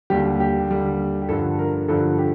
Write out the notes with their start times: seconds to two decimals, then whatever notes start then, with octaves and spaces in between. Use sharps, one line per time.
0.10 D#2 D3 G3 G4
0.40 G4
0.70 D#2 D3 G3
1.22 G4
1.29 G2 D3 F3 A4
1.59 A#4
1.88 G2 D3 F3 A4
2.19 G4